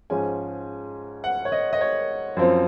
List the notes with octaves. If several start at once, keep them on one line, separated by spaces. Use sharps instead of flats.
G#2 F3 G#3 C#4 G#5
F#5
C#5
D#5
D#5
C#5
F#2 F3 C4